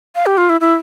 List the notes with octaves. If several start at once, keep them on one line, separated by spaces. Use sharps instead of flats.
F5
G4
F4
E4
E4